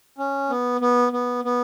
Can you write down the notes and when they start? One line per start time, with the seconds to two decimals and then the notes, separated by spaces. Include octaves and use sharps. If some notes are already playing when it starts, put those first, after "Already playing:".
0.18 C#4
0.50 B3
0.81 B3
1.13 B3
1.44 B3